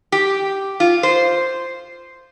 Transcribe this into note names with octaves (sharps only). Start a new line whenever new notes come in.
G4
F4
C5